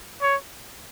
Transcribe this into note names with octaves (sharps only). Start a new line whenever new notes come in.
C#5